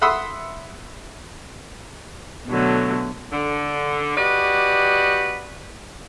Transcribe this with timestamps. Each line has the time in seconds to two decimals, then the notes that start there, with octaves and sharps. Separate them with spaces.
0.02 E5 F#5 B5 C6 D#6 E6
2.47 B2 D3 F#3 A3
3.32 D3
4.17 F#4 G4 B4 D5 D#5